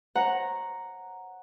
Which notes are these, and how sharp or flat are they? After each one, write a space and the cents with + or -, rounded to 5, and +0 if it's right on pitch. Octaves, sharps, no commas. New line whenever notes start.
C#5 -45 F#5 -5 A#5 +0